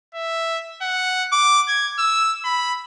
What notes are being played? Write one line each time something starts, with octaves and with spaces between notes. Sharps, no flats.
E5
F#5
D6
G#6
E6
B5